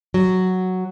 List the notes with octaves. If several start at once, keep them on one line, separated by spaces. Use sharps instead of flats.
F#3